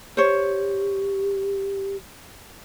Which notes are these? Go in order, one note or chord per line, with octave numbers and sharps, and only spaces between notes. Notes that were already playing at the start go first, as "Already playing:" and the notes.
G4 C5 C#5